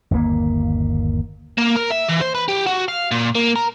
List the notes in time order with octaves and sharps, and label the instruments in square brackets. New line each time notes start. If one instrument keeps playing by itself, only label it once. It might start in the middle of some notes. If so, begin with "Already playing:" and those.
[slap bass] G1 D#2 A#2 A#3
[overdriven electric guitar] A#3
A#4
E5
E3
C5
B4
G4
F#4
F5
A#2
A#3
A#4